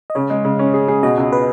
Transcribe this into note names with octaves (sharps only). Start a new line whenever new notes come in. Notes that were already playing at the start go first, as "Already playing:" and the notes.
D#5
C#3 C#5
G#3
C#3
C#4
G#4
G#4
B2 D#5
C#2
B4